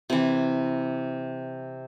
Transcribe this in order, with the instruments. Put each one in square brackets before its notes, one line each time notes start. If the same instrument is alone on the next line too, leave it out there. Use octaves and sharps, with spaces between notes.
[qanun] C3 E3